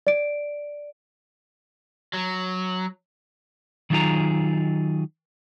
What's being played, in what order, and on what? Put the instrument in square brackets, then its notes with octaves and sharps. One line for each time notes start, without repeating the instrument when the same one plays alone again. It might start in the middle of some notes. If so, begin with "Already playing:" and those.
[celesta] D5 D7
[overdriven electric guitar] F#3
[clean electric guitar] D#3 F#3 D#4 F4 G#4 A#5